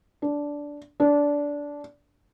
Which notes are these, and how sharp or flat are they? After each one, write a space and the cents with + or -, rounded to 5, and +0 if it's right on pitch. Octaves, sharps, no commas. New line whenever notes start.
D4 -10
D4 -15